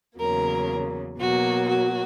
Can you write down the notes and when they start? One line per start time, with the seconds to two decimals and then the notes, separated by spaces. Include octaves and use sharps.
0.19 E2 C#3 F#3 A#3 A#4
1.19 B2 F#3 A#3 F#4
1.69 F#4